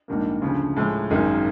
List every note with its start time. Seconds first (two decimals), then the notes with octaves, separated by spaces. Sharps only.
0.08 A#1 G#2 D#3 G3 A#3
0.42 D2 C#3 F3
0.76 A2 F3 G#3
1.10 G#1 F#2 D#3 G#3